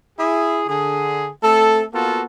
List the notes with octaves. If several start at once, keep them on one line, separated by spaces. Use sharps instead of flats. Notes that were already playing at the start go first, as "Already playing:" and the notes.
E4 G#4
D3 G#4
A3 C4 A4
A#3 B3 F4 F#4 A4